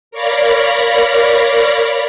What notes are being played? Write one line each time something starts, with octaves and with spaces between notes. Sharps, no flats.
A#4 C#5 D5 F5 A#5 B5